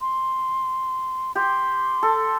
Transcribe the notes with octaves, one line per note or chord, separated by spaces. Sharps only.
C6
G4 C6
A4